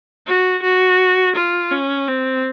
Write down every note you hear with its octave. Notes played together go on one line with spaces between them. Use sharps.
F#4
F#4
F4
C#4
C4